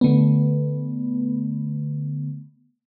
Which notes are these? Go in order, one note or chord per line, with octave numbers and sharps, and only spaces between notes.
D3 A3 B3